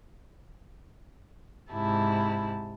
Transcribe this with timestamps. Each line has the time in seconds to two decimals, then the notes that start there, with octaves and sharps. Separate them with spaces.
1.72 G#2 C3 E4 A5